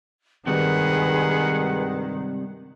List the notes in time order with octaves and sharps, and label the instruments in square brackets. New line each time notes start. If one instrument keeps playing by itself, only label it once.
[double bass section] G2 D#3 [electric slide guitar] C3 G3 G#3 [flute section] G#4 B4 [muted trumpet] F#5